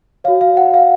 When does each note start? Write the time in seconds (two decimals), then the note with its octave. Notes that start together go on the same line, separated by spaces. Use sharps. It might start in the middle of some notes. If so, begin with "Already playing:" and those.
0.24 F#4 C#5 F5
0.41 F5
0.57 F#5
0.74 F5